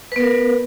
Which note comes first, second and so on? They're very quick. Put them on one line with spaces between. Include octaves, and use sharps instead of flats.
B4 B3 A#4